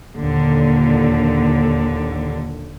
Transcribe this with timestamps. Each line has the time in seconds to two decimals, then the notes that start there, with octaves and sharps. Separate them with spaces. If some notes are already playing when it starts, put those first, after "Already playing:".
0.17 D#2 A#2 D3